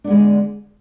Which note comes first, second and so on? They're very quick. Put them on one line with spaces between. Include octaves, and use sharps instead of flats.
D4 B3 G#3 D3